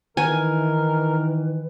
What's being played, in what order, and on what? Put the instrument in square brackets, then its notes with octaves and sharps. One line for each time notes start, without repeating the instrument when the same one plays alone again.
[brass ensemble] D#3 E3 [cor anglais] A#4 [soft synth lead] B4 [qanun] G#5